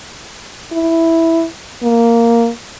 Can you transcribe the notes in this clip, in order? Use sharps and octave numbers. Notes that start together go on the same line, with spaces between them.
E4
A#3